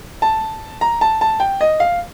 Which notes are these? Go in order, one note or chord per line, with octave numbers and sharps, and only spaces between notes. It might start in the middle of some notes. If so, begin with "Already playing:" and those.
A5
A#5
A5
A5
G5
D#5
F5